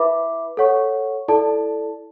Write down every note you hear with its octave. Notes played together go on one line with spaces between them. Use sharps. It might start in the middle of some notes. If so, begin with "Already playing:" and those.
Already playing: E4 B4 E5 B5 D6
A4 C#5 F#5 C#6
E4 A4 D5 A5